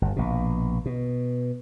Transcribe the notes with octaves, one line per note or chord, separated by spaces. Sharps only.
G1
A#1 B2
B2